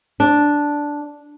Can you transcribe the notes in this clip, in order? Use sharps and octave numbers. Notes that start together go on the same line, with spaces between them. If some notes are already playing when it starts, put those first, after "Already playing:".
D4